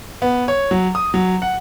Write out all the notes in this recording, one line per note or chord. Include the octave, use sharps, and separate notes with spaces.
B3
C#5
F#3
D#6
F#3
F#5